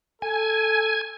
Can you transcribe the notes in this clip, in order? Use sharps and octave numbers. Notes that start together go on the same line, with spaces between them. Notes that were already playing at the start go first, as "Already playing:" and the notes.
A4 G#5